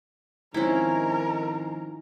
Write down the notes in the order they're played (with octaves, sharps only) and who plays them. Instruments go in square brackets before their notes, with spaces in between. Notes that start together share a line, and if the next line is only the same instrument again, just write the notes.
[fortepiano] G#2 C4 [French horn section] D#3 F3 D#4 [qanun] C#4 E4 [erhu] A#4